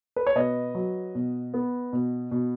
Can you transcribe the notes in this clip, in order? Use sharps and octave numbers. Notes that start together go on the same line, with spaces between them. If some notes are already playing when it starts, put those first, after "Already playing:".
B4
C#5
B2 B4 D#5
F#3
B2
B3
B2
B2